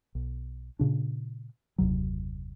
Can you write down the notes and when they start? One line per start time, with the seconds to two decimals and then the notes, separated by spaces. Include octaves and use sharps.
0.15 B1
0.79 A#2 C#3 D4
1.78 F#1 D#2 C3 F#3